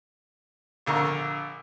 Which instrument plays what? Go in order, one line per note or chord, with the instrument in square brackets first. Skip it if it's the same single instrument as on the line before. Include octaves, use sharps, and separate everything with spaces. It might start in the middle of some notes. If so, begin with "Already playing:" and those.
[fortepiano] A#1 D3 A#4 A#5 C#6